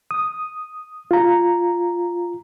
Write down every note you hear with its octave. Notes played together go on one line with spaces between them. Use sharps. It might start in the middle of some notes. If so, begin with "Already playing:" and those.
D#6
F4 A#5